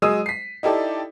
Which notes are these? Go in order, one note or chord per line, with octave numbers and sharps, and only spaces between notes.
F#3 G#3 G#4 D#6 E6 D#7
B6 C7
D#4 E4 G4 A4 D5